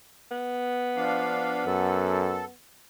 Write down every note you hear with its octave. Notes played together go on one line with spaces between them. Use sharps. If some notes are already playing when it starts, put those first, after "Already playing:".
B3
F3 D4 F5
F#2 A4